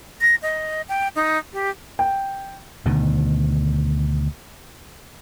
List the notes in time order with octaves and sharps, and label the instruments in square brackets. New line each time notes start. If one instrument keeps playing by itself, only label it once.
[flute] A#6
D#5
G5
D#4
G4
[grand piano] G5
[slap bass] D2 B2 D#3